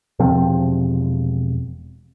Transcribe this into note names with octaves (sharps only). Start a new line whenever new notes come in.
E1 C3 F3 C4